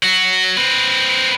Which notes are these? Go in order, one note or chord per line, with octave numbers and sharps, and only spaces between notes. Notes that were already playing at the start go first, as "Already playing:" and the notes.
F#3 F#4
C4 B4